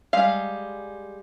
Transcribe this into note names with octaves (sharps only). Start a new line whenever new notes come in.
G3 G#3 F5